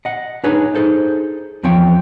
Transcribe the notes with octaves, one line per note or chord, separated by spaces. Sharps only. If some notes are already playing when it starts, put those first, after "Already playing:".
D#5 F#5
D4 D#4 G#4 B4 C#5
D#4 G#4 A4 C5
E2 F3 C4 C#5 G5